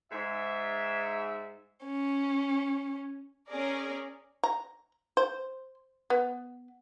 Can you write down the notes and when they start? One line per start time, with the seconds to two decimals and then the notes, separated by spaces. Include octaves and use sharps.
0.12 G#2 E5
1.85 C#4
3.48 C#4 G#4 A#4 D5
4.44 A#5
5.17 C5
6.10 B3